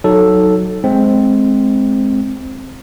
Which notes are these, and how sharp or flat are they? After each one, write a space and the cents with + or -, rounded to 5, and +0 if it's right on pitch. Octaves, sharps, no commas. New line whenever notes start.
F#3 +0 D#4 +10 A4 +0
G#3 +15 C4 +0